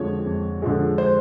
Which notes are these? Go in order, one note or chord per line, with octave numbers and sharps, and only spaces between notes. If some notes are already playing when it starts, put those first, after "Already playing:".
Already playing: F2 D3 F3 G#3 C#5
F2
D3 F3 G#3
C5